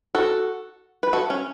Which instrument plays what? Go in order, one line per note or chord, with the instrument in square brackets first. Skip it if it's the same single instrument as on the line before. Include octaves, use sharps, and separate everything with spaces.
[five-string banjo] F#4 A4
B4
F#4 A4
C#4